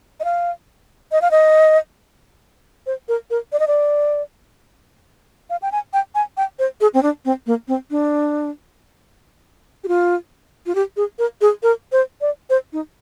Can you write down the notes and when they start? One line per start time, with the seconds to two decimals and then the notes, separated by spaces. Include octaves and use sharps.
0.20 D#5
0.24 F5
1.12 D#5
1.22 F5
1.31 D#5
2.87 C5
3.09 A#4
3.30 A#4
3.53 D5
3.60 D#5
3.68 D5
5.50 F5
5.62 G5
5.72 G#5
5.93 G5
6.15 G#5
6.37 G5
6.59 C5
6.81 G#4
6.94 C4
7.03 D4
7.25 C4
7.46 A#3
7.68 C4
7.91 D4
9.84 G4
9.88 F4
10.66 F4
10.75 G4
10.97 G#4
11.19 A#4
11.41 G#4
11.63 A#4
11.92 C5
12.21 D5
12.50 C5
12.73 D#4